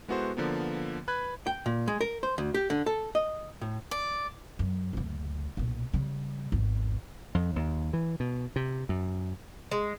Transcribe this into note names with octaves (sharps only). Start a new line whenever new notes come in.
G#3 B3 E4 F#4 A4 C5
D3 F3 A#3 B3
B4 B5 F#6 G#6
G5
A#2
G#3
A#4
C5
D2
G4
D3
A4
D#5
A2
D5
F#2
F#1 D2
B1 A#2
C#3 G3
G#1 E2
F2
D#2
E3
B2
C3
F#2
G#3